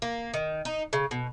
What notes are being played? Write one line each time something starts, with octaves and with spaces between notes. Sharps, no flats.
A#3
D#3
D#4
C#3
B2